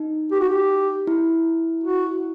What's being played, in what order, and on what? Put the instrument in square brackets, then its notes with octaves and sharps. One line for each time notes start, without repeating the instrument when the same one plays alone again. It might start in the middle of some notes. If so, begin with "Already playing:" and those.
Already playing: [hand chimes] D#4
[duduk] G4
F#4
G4
[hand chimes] E4
[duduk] F#4